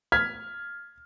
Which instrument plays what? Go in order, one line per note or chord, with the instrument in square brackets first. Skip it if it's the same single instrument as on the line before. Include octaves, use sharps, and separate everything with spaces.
[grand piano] F6 G#6 B6